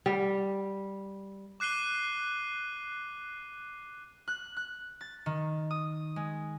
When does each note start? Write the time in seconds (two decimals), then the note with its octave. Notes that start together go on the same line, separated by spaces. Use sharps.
0.06 G3
1.60 D6 F#6 C7 D#7 G7
4.28 F#6
4.57 F#6
5.01 A6
5.26 D#3
5.71 D#6
6.16 G#3